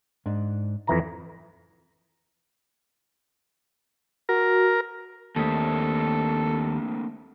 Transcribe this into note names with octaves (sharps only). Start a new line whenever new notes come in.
G#2 D4
F2 E3 A#5
F#4 A#4
D#2 A3 A#3 C4 D4 A4 A5